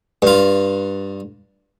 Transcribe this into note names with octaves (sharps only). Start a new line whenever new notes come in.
G2 F4